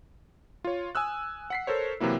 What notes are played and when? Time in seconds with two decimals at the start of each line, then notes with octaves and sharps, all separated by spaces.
0.64 F4 C#5
0.95 G#5 D#6 E6 F#6
1.50 F#5 B6 C7
1.67 A4 A#4 C5 C#5
2.00 C3 E3 F#3 A#3 E4